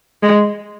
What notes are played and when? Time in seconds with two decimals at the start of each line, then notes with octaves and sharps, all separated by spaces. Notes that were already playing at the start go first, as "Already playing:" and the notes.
0.23 G#3